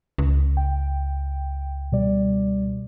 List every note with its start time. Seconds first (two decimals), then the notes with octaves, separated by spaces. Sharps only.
0.18 C#2
0.57 G5
1.92 B2 G3 D5